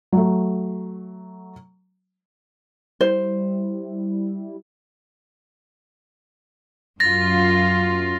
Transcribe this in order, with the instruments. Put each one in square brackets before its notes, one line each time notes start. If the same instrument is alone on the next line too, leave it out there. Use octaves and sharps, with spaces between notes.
[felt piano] F#3 A3
[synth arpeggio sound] G3 E4 [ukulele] C5
[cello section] F#2 F4 [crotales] A6 A#6